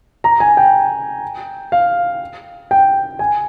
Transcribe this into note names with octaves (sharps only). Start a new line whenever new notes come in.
A#5
G#5
G5
F5
G5
G#5